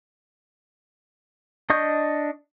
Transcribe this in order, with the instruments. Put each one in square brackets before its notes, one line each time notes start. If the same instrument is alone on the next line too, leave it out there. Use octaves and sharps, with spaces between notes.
[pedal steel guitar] D4 D#5 C#6 D#6 G6